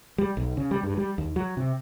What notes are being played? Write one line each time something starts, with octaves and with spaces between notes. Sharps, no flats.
G3
B1
C#3
G3
G2
G3
D#2
F#3
C3